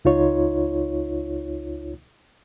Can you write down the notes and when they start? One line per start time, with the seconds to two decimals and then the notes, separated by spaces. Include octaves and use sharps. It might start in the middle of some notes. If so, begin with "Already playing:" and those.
0.05 C#2 D#4 F4 C#5